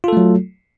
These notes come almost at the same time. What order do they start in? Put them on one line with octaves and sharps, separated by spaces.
F4 A4 A3 F#3